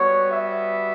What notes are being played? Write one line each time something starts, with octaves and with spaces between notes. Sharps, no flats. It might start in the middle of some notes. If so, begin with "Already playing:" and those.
Already playing: G3 B3 F#4 C#5
E5